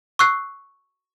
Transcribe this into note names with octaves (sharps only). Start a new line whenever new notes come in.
C#6 E6 F#6 C7